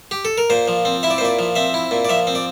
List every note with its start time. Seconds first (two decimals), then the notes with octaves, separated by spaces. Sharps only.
0.11 G4
0.25 A4
0.38 A#4
0.50 A#2 C5
0.68 F3
0.85 C4
1.03 E4 E5
1.10 D5
1.18 C5
1.21 A#2 D5
1.39 F3
1.56 C4 E5
1.74 E4
1.91 A#2
2.05 D5
2.09 F3 E5
2.27 C4
2.35 D5